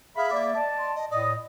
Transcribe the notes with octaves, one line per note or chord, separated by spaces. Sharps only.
G#4 E5 F5 B5
A#3 D5
D5 D#5 A5
C6
D#5
A2 D5 D#5